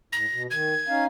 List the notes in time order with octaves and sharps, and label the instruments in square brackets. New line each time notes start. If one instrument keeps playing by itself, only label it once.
[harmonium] A2 [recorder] A#6
[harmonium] B2
[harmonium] D#3 [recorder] G#6
[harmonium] C#4 D#4 F5